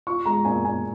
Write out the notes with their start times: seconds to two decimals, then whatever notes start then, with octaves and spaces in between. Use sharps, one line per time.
0.07 F4 C#6
0.26 G#3 A#5
0.45 A#2 G#5
0.65 A#2 G#5